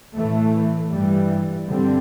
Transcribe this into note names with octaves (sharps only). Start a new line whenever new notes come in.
A2 E3 A3
G2 E3 G3
G2 D3 G3 C4